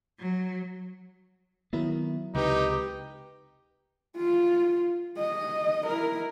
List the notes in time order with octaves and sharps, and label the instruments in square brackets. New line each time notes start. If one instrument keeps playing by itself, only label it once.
[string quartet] F#3
[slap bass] D#3 B3 [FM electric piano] F#3 E4 A#4
[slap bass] C#2 C3 [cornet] D#4 [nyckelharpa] G4 B4
[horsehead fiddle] F4
D#5
E4 A#4